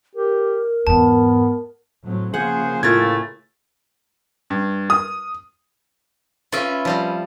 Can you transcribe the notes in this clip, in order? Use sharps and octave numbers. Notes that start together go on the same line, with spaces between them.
G4 A#4
E2 G#2 B3 A5
A2 F#3 C4
C#3 F3 A#3 G#4 C5 F#5
A2 A3 F4 G#4 A#4 G#6 A6
G2
D#6 F6
C#4 F4 B4 E5
F3 G3 C4